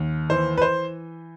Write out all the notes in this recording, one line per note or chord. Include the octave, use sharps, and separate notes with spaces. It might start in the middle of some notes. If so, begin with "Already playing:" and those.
Already playing: D#2
E3 C5
B4
C5